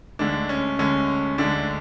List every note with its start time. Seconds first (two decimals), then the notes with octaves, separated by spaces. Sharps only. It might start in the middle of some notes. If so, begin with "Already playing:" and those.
0.19 D2 D3 G#3 D4
0.49 C#4
0.79 D2 D3 G#3 C#4
1.38 D2 D3 G#3 D4